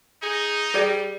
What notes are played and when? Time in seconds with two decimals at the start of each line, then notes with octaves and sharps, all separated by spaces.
0.23 D#4 G#4
0.74 G3 G#4 D5